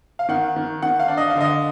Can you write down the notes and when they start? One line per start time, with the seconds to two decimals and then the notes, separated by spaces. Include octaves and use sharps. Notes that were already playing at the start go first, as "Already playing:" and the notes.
0.19 F5
0.29 D#3 F#5
0.56 D#3
0.82 D#3 F#5
0.99 F5
1.08 D4
1.17 D#5
1.30 F5
1.35 D3
1.41 D#5